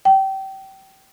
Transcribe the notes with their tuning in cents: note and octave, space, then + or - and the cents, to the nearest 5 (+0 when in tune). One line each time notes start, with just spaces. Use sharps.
G5 -25